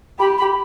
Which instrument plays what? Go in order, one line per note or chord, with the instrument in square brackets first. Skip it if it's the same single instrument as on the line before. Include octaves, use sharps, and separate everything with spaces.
[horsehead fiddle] G4 [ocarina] B5
[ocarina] B5